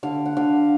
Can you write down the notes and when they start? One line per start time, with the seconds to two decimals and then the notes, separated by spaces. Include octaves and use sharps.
0.03 D3 F5
0.26 F#5
0.37 D3 F5